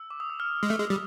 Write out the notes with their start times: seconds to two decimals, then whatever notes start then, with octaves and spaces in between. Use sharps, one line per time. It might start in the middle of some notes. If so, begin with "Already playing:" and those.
Already playing: E6
0.11 D6
0.20 D#6
0.30 E6
0.40 F6
0.63 G#3
0.70 A3
0.80 G#3
0.90 G3